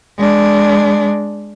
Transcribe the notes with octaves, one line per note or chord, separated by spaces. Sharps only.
G#3 D4